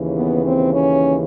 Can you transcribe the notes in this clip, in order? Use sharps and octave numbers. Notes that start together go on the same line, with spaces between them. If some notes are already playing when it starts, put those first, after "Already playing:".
Already playing: D#2 C#3 E3
B3
C4
C#4